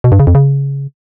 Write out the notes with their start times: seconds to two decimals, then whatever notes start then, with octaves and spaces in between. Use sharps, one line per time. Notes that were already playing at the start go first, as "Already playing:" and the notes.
0.04 B2
0.12 G2
0.20 C#3
0.27 F2
0.35 C#3